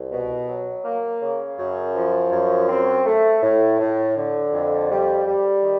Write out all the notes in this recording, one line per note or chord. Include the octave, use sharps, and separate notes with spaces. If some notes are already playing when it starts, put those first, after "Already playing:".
Already playing: C2
B2
F#3
A#3
C#3
F#2
F3
F#2
C4
A3
A2
A2
D3
F2
G3
G3
D#3